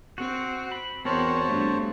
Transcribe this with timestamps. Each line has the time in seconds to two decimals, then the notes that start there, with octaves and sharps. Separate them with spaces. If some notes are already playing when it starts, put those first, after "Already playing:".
0.18 C4 F#4
0.72 B5
1.05 E2 B3 C4 F#4 A#4 C5 C#5 A5
1.49 G2 A3